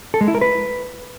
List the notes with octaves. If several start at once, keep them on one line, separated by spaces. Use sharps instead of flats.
A4
G#3
E4
A#4
B4